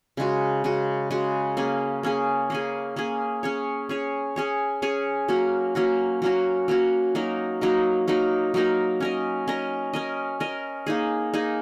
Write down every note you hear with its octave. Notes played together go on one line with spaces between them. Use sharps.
C#3 G#3 F#4
C#3 G#3 F#4
C#3 G#3 F#4
A#3 C#4 G#4
A#3 C#4 G#4
A#3 C#4 G#4
A#3 C#4 G#4
C#4 G#4 C#5
C#4 G#4 C#5
C#4 G#4 C#5
C#4 G#4 C#5
F#3 A#3 C#4 F#4
F#3 A#3 C#4 F#4
F#3 A#3 C#4 F#4
F#3 A#3 C#4 F#4
F#3 A#3 D#4 A#4
F#3 A#3 D#4 A#4
F#3 A#3 D#4 A#4
F#3 A#3 D#4 A#4
C#4 A#4 D#5
C#4 A#4 D#5
C#4 A#4 D#5
C#4 A#4 D#5
A#3 D#4 G#4
A#3 D#4 G#4